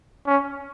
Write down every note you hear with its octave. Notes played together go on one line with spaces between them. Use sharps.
C#4